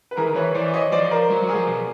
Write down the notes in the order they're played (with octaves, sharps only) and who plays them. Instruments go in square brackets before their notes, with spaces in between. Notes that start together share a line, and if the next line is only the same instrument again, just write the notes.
[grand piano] B4
[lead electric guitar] E3 [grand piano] G#4 A#4
[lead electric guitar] D#3
[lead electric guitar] E3 [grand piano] B4 C#5
[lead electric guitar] E3 [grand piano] C5 D5
[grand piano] C#5 D#5
[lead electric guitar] F3 [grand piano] C5 D5
[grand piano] A#4 C5
[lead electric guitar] F#3
F#3
[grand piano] G#4 A#4
[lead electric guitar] F3
B2